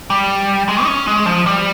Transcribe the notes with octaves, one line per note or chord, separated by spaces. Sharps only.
G3
G#3
D#4
C#4
G#3
F3
G3